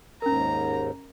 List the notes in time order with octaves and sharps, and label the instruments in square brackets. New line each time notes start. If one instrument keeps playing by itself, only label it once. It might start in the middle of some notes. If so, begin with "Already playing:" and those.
[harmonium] D#2 G#2 [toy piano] C#4 A#4 [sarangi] A#5